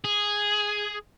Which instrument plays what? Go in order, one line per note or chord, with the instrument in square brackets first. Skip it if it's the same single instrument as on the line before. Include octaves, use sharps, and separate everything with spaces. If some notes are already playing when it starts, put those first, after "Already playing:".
[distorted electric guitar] G#4